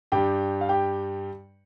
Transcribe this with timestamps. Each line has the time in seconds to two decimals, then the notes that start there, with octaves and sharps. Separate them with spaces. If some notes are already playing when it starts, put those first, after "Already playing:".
0.12 G2 G3 G4 G5
0.61 F5
0.69 G4 G5